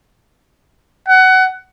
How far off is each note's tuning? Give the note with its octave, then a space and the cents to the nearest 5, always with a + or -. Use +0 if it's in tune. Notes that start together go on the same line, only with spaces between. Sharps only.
F#5 +20